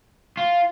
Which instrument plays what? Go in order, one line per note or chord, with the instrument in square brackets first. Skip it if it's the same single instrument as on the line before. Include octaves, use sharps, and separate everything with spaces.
[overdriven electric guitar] F4